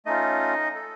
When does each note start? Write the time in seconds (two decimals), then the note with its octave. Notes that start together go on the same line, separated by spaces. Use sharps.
0.06 A3 C#4 D#4 F4 D#5
0.75 A4